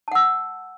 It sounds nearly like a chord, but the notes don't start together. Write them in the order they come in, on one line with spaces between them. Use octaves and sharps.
A5 F#5 E6